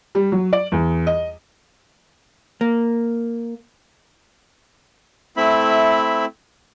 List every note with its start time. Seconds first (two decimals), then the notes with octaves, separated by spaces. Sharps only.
0.15 G3
0.32 F#3
0.53 D5
0.72 E2
1.07 D#5
2.61 A#3
5.37 A3 C4 E4 E5 B5